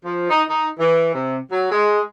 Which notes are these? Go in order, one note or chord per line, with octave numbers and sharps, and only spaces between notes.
F3
D#4
D#4
E3
C3
F#3
G#3